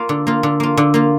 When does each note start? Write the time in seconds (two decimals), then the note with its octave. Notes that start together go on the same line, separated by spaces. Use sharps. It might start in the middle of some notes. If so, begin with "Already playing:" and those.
Already playing: A#3 F4
0.09 D3
0.27 A#3 F4
0.43 D3
0.60 A#3 F4
0.77 D3
0.94 A#3 F4